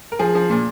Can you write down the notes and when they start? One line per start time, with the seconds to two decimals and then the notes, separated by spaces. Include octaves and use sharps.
0.12 A#4
0.19 F3 G#4
0.35 F3
0.50 A#2